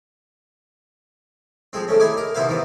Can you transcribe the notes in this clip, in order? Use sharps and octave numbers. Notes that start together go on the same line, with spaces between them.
F3 G#3 C4
D#3 A3 C#4
D#4 E4 G#4 G#5 D6
A#4
D#2 C3 B3 E4 C5 F5
D#3 E3 B3